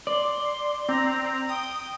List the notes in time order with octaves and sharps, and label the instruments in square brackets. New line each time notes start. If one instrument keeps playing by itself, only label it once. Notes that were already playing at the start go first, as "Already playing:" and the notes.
[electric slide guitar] D5 [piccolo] C6
[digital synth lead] C4 [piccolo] A#5
[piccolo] G5 [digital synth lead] D#6